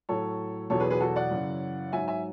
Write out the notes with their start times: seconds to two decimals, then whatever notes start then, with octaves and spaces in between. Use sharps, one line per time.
0.09 A2 F#3 A4 C#5
0.70 E2 B2 F#3 A4 C#5
0.80 G#4 B4
0.90 G#4 B4
1.01 F#4 A4
1.16 D5 F#5
1.31 F#2 C#3 E3
1.92 G#2 F#3 E5 G#5
2.08 E5 G#5